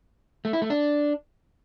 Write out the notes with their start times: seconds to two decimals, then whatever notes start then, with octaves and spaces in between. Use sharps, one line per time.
0.45 A3
0.53 E4
0.62 A3
0.70 D4